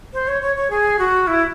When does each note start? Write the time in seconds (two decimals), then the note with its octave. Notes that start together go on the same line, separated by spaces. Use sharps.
0.14 C5
0.28 C#5
0.42 C#5
0.56 C#5
0.70 G#4
0.99 F#4
1.27 E4